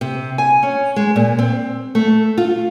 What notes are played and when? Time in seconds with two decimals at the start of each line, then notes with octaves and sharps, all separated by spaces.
0.01 C3
0.38 G#5
0.63 C#4
0.96 G#3
1.16 A#2
1.39 C4
1.95 A3
2.38 F4